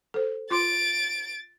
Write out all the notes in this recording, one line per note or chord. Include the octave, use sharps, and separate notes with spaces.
A4 C5
F4 C6 D6 A6 D7